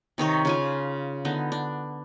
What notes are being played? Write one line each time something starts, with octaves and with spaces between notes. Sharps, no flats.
C3 D#3 D#4 C#5
C#3 F4 G#5
D3 B3 D#4
D4